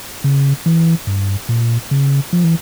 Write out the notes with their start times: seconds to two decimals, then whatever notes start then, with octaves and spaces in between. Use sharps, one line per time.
0.24 C#3
0.66 E3
1.07 G2
1.49 A#2
1.91 C#3
2.33 F3
2.44 E3